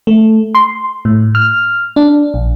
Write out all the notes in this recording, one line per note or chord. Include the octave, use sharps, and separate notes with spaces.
A3
C6
A2
F6
D4
A#1